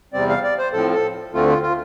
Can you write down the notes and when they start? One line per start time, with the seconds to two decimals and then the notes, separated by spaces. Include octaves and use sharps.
0.13 E2 C3 G3 C4 D5
0.29 F5
0.44 D5
0.58 C5
0.73 A2 F3 C4 A4
0.93 A4
1.33 D2 D3 A3 C4 F4
1.48 F4
1.63 F4